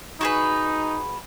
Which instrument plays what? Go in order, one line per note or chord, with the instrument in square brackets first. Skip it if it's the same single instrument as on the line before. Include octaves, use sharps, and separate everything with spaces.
[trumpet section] D#4 [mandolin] F#4 G#4 B4